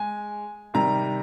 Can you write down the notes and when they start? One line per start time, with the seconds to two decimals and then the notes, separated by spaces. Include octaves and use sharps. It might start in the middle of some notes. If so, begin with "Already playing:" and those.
Already playing: G#3 G#5
0.74 C3 D#3 G3 A#5